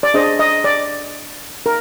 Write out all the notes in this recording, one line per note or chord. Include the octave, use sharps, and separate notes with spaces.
D5
D4 G#4 C5 D#5
D#5
D5
A#4